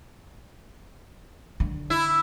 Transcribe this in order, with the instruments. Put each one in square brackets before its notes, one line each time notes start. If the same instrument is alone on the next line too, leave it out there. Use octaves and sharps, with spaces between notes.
[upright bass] D3
[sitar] E4